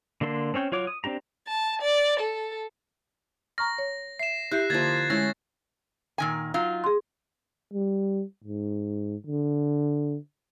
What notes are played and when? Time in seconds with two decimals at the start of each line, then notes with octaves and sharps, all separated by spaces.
0.21 D3 A#3 A4 C6
0.54 C4 C#4 C#5 G5
0.72 F#3 F4 C#5 D6
0.87 D#6
1.04 C4 D4 G4 A#5
1.48 A5
1.82 D5
2.20 A4
3.58 A#5 C#6 F6 A#6
3.78 C#5
4.19 E5 C7 E7
4.52 E4 G4 E5 F#6 G6 C7
4.70 D3 F3 A#3 G#6 A6
5.10 G#3 A3 C#4 E4 A#6
6.18 A#2 D#3 G#5
6.54 F#3 D#4 F4
6.84 G#4 C6
7.74 G3
8.44 G#2
9.27 D3